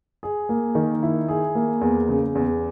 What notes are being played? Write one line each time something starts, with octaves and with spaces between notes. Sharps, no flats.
G#4
A#3
D#3
E4
G#4
A#3
E2
C#3
E2